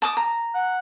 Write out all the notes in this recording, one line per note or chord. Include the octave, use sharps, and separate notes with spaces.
A5 D6 D#6
A#5
F#5